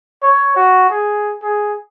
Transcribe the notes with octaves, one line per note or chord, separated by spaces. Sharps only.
C#5
F#4
G#4
G#4